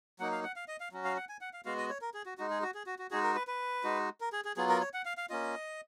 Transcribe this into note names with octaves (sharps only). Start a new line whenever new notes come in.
F#3 A#3 D#4 F#5
F5
F#5
F5
D#5
F5
F#3 C#4 F#4
F5
F#5
G#5
F#5
F5
G#3 B3 F#4 F5
D#5
C#5
A#4
G#4
F#4
G#3 D#4 F#4
G#4
F#4
G#4
F#4
F#4
G#3 D#4 F#4 G#4
A#4
B4
B4
G#3 D#4 F#4
A#4
G#4
G#4
F#3 B3 F4 G#4
A#4
C#5
F#5
F5
F5
A#3 C#4 F4 D#5